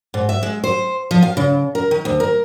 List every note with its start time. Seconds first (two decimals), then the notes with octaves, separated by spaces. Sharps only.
0.14 G#2
0.29 E5
0.43 G#3
0.64 C5
1.11 F3
1.23 F5
1.37 C#3
1.75 A#4
1.91 D#3
2.05 D2
2.20 A#4